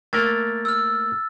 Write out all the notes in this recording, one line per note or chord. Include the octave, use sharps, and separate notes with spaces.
A3 A#3 A#4 A6
E6 F6